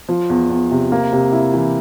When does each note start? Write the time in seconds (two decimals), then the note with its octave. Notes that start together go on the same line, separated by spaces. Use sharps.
0.09 F3
0.30 E2
0.50 E2
0.71 C3
0.92 A#3
1.12 C3
1.32 E4
1.54 E3